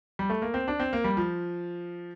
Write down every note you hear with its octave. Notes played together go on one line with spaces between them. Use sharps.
G3
A3
A#3
C4
D4
C4
A#3
G3
F3